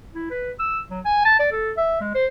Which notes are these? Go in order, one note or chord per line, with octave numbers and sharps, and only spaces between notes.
E4
B4
E6
F#3
G#5
A5
D5
A4
E5
G#3
C5